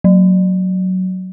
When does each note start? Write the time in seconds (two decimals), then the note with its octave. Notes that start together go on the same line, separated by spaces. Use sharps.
0.04 F#3